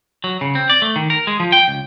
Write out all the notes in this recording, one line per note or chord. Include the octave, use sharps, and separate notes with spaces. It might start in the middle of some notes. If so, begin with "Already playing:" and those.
F#3
C#3
C4
D5
A3
D#3
A#4
G#3
F3
G5
C#2